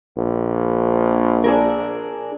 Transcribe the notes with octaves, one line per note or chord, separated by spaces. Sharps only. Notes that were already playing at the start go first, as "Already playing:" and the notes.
A#1
D4 G#4 A#4